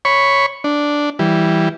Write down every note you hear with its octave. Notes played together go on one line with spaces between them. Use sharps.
C#5 B5 C#6
D4
E3 G3